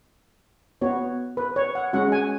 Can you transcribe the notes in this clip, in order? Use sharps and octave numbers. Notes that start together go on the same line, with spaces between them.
B3 F#4 C#5
B4
C#5
F#5
G#3 C#4 F#4 F#5
G#5